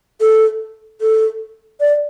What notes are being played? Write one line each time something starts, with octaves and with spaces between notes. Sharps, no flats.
A4
A4
D5